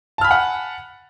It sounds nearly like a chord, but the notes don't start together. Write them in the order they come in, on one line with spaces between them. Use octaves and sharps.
A5 F6 B5 G#5 F#5